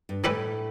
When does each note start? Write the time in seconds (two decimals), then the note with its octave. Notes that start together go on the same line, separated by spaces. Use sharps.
0.09 G2
0.24 A2 E3 G3 E4 G4 B4